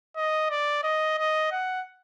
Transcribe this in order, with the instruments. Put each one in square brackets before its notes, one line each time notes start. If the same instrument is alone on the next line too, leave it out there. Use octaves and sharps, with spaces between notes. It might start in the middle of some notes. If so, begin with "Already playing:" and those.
[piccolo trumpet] D#5
D5
D#5
D#5
F#5